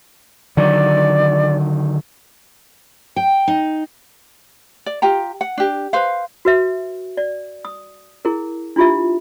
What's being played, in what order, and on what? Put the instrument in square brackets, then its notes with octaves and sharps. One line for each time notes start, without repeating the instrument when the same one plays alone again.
[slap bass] D3 D#3 F#3 [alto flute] D5
[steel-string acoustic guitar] G5
D#4
[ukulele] D5
F4 G4 G5 A#5
F#5
D4 G4
B4 C5 F5
[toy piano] F#4 B4 E5
D5
D#6
E4 G#4 A#4
D4 E4 F4 G4 E5